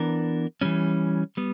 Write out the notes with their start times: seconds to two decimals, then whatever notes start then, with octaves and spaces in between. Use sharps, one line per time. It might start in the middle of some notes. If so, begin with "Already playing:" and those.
Already playing: E3 B3 D4 A#4
0.61 E3 G3 C#4
1.37 G3 B3